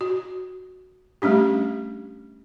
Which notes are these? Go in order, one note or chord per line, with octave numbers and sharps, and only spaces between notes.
F#4
G3 A3 C#4 D4 G4